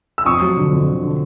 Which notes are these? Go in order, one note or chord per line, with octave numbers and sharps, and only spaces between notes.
E6
F2 C#6 D#6
F#3
D3
F2
D3
D3